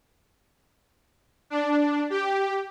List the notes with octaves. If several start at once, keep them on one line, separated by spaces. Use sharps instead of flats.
D4
G4